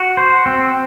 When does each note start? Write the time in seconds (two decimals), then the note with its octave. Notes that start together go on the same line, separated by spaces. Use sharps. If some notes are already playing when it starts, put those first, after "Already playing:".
Already playing: F#4
0.17 C5
0.46 C4